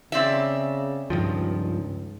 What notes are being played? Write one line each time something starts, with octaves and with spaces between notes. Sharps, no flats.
C#3 C4 D5 E5
C#2 G2 D#3 F3